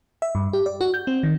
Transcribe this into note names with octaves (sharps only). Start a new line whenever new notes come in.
E5
G2
G4
D5
F#4
G6
C4
D#3